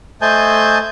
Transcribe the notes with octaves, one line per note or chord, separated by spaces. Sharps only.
A3 C5 D#5 G#5 A5 G6